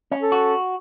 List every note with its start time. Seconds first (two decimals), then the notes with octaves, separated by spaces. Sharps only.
0.11 C#4
0.22 A4
0.32 F#4